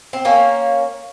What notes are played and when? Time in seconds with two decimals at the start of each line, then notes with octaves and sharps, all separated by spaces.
0.13 C4
0.25 A#3 C#4